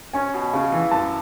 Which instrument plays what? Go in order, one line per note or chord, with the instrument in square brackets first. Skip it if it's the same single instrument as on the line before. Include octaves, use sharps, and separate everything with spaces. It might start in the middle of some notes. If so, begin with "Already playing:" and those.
[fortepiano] C#4 [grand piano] G#5
[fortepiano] B2
C#3
E3
[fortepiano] F#2 [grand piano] A5